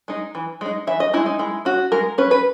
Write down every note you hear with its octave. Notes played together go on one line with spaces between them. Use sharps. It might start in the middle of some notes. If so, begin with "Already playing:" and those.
G#3 D#4
E3
G#3 D#4
E3 E5
D#5
G#3 D#4 E4
D#4
G#3 E4
C#4 F#4
G#3 A#4
C#4 B4
B4